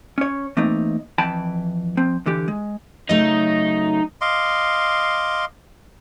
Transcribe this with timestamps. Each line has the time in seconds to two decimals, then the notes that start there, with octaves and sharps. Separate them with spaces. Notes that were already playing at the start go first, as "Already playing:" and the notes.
0.18 C#4 C#5
0.57 E3 A3 A#3 C4 D#4
1.18 F2 E3 G5 A5 B5
1.97 F3 C4
2.26 D3 E3 G4
2.48 G#3
3.09 C#3 F#3 A3 D#4
4.21 D#5 F5 C6 D6